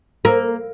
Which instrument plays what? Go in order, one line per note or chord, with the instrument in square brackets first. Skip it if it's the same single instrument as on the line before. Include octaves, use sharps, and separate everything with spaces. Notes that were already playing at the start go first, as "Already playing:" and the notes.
[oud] A#3